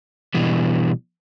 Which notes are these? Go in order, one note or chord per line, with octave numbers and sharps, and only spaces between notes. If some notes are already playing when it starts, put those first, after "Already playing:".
B2 E3 G3